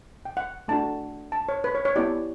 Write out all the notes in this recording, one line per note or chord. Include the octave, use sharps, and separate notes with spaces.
G5
F#5
A3 D4 F#4 A5
A5
C#5
B4
C#5
C#5
B3 E4 G4 D5